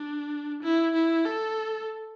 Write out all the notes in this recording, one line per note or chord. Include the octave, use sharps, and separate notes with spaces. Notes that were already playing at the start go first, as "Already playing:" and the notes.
Already playing: D4
E4
E4
A4